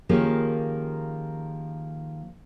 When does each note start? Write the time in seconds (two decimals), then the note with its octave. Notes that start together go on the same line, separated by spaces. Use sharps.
0.09 D#3 F3 A#3 C#4 G4 G#4